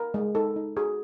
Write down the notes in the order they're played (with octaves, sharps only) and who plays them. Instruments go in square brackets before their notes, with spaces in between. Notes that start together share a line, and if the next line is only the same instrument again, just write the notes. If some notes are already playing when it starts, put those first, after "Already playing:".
Already playing: [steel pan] A#4
G#3
D#4 A4
D#4
F#4 G#4